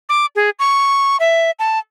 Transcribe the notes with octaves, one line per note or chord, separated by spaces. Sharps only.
D6
G#4
C#6
E5
A5